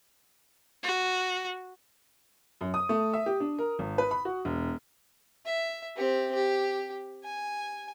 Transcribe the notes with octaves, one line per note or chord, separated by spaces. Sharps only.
F#4
F#2
D#6
A3
E5
G4
D4
A#4
G#1
B4
B5
F#4
E1
E5
C4 G4
G4
G#5